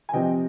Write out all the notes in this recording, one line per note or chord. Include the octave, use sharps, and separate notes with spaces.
G#5
C3 F3 C4 D#5 G5